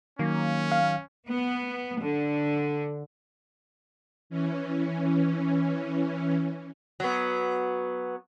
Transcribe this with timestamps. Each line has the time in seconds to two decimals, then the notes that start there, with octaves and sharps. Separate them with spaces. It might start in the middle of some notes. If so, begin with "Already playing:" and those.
0.19 D#3 F#3 A#3 C#4
0.72 F5
1.28 B3
1.98 D3
4.30 E3 C#4
7.00 F#3 B3